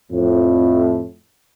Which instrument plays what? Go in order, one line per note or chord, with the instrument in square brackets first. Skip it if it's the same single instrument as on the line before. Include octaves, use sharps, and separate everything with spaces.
[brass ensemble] F2 A2